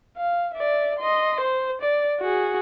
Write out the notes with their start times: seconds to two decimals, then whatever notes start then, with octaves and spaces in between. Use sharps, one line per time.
0.17 F5
0.54 D5 E5
0.99 D#5 C6
1.41 C5
1.82 D5
2.21 F#4 G#4